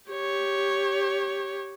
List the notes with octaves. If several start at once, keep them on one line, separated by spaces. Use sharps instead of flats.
G4 C#5